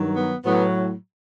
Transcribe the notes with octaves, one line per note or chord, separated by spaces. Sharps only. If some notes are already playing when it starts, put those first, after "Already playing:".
Already playing: G2 D#3 F#3
B3
A2 F#3 B3